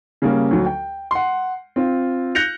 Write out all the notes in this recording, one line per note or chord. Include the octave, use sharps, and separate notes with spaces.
C#3 G3 A#3 C#4
D2 F#3
G5
F#5 C6
C4 F4
F#6 G6 A#6 C#7 F7